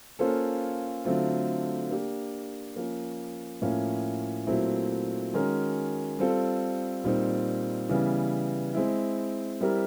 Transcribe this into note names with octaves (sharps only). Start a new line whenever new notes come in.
A#3 C#4 F4 A4 C5
D3 F#3 A3 C4 F4
A#3 D4 G4
F3 A#3 C#4
A2 F3 A#3 C#4
A#2 F#3 A3 C4 E4
D#3 G#3 C#4 F#4 A#4
G3 C4 F4 A4
A#2 G3 C4 D#4
C#3 E3 G3 B3
G#3 C4 E4
G3 C4 E4 G4 A#4